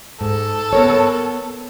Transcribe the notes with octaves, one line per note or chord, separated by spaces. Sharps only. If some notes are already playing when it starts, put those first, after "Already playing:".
G#2 A4
B3 A#4 C#5